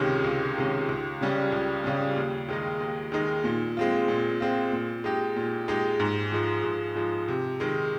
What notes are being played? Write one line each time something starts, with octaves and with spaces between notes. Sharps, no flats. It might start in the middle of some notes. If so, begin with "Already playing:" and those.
Already playing: C#2 C3 D#3 G#3 C#4
C#2
C3 D#3 G#3 C#4
C#2
C#3 G3 C#4
C#2
C#3 G3 C#4
D#2
D#3 G#3 D#4
D#2
D#3 G#3 D#4
A#2
G#3 C4 F4
A#2
G#3 C4 F4
A#2
G#3 D#4 G4
A#2
G#3 D#4 G4
G#2
F3 G#3
G#2
F3 G#3
C3
D#3 G#3